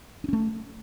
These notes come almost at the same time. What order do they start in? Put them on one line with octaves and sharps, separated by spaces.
D4 C#4 A3